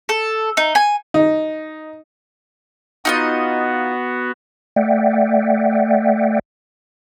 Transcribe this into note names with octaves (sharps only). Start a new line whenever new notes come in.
A4
D#4
G#5
D#4
B3 D#4 F4 F#4 D#5
A3 D5 E5 F#5 G5